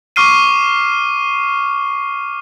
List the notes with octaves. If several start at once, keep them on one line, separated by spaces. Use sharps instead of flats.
C#6 D6 F6 C7 D#7